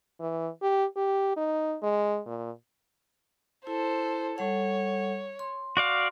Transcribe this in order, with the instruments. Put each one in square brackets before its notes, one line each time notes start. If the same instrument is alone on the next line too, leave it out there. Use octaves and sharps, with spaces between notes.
[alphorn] E3
G4
G4
D#4
G#3
A#2
[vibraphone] E4 [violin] A4 C5
[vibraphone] G3 A4 F#5 [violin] C#5
[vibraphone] C6
[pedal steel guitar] F#4 D5 F5